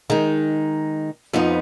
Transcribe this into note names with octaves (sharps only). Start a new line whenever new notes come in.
D#3 G#3 D#4
F2 F3 B3 D#4